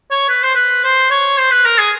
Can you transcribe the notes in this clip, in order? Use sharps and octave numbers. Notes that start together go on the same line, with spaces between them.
C#5
B4
C5
B4
C5
C#5
C5
B4
A#4
G#4